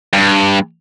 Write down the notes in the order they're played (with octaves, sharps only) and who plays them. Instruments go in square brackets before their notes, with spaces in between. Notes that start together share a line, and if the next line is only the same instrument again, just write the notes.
[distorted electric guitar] G2